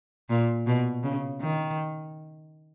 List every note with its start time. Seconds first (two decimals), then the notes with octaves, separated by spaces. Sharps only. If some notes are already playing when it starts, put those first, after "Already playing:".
0.30 A#2
0.66 B2
1.03 C#3
1.40 D#3